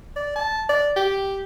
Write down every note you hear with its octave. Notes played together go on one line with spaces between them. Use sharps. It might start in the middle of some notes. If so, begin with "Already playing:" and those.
D5
A5
D5
G4